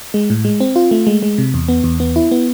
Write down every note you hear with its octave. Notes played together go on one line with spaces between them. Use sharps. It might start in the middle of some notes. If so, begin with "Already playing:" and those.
G#3
A2
G#3
C4
F4
A3
G#3
G#3
C3
E2
B3
E2
B3
E4
B3